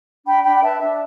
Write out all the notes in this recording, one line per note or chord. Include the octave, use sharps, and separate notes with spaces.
D4 G5 B5
D4 G5 B5
G5
B4 E5 A5
D4 E5